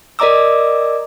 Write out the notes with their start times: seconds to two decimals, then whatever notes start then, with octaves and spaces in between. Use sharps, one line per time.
0.19 A#4 D5 D#5 A#5 D6 E6